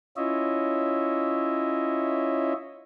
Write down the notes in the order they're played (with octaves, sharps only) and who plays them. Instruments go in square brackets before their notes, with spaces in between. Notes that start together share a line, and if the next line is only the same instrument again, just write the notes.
[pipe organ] C#4 E4 F4 C#5 D#5 E5